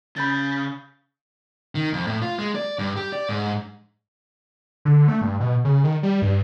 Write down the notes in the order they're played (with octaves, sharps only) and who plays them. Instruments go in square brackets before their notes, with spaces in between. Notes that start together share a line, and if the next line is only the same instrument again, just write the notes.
[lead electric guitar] C#3 [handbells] B5 G6 A6
[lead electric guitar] D#3
F2
A2
F4
G#3
D5
G2
G4
D5
G#2
[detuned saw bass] D3
A3
G2
B2
C#3
D#3
G3
G2